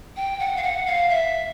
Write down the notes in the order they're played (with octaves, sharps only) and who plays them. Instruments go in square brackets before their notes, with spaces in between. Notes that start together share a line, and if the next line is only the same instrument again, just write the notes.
[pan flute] G5
F#5
F5
F#5
F5
E5